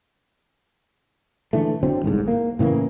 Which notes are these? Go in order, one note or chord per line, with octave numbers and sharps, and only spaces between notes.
D3 E3 A3
D3 F#3 C4
G1 C2 G#2
A#3
A2 C#3 E3 A#3